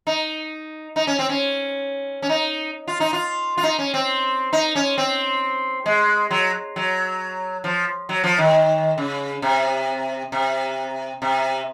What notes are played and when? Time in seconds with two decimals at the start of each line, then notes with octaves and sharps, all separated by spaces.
0.07 D#4
0.96 D#4
1.07 C#4
1.19 C4
1.29 C#4
2.22 C#4
2.29 D#4
2.88 F4
3.00 D#4
3.13 F4
3.58 F4
3.63 D#4
3.79 C#4
3.94 C4
4.53 D#4
4.75 C#4
4.98 C4
5.86 G#3
6.31 F#3
6.76 F#3
7.64 F3
8.09 F#3
8.24 F3
8.38 D#3
8.98 C#3
9.42 C3
10.32 C3
11.22 C3